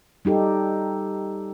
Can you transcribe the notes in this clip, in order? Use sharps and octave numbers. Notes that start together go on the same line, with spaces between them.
G3 D#4 G4 A4